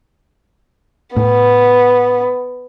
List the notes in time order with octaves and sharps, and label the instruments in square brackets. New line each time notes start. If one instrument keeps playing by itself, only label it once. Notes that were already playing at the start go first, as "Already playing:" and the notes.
[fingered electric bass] A2 [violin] B3